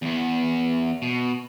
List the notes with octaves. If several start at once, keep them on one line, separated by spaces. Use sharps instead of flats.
E2 B3
B2